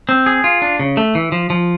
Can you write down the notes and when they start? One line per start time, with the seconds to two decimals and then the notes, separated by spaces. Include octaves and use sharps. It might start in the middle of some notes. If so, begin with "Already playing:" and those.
0.09 C4
0.26 G#4
0.44 F4
0.62 D4
0.79 C#3
0.97 A3
1.15 E3
1.32 F3
1.50 F3